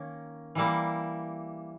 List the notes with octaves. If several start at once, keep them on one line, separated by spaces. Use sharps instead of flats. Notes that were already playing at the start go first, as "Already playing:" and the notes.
Already playing: D#3 A#3 C#4
E3 G3 A#3 E4